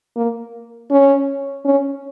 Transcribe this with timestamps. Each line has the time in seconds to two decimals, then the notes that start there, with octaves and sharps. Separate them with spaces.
0.16 A#3
0.91 C#4
1.65 C#4